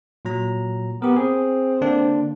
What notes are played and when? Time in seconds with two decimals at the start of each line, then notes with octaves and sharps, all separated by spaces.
0.25 A#2 F#3 A#5
1.02 B3 G4 A#4
1.17 C4 G#4
1.81 D3 A#3 D4